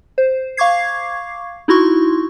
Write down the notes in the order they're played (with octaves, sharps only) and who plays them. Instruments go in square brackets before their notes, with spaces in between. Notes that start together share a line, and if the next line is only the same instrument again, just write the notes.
[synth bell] C5
F5 C#6 D6 G#6 C7
D#4 E4 F#4 C6 C#6